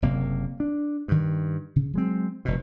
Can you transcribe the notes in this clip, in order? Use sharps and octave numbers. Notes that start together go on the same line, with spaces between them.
F#1 C3 A#3
D4
G2 D#3
C#3
F#3 G#3 C4
F1 B2